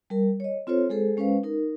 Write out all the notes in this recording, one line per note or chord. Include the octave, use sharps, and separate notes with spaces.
G3 A#4
C#5 D#5
C4 F4 A4 C5 C#5
G#3 G#4 A4 C5
G#3 C#4 B4 C5 F5
D#4 A#4